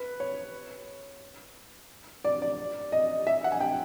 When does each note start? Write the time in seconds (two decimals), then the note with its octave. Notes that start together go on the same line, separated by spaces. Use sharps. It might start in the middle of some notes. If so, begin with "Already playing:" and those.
Already playing: B4
0.20 C#5
2.24 D5
2.42 D5
2.92 D#5
3.27 E5
3.44 F#5
3.52 G#5
3.61 G5